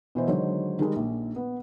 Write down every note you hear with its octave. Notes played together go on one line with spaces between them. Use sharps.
B2 E3 C5
D3 D#3 F#3 G#3 C5 C#5
D#3 G3 G#3
A#1
B3